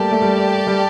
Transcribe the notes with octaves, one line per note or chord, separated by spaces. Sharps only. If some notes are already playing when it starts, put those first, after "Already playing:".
Already playing: G3 A3 A#3 G4 D5 A5
A3
G3
G3